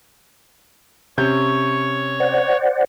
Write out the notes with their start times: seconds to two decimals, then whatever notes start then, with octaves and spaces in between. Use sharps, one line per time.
1.18 C3 C#4 C#5 C#6 G6
2.20 C5 D5 F#5